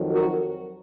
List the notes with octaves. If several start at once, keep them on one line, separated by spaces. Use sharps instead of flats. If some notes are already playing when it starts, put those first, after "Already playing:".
Already playing: F2 D#3 F#3
F#4 A#4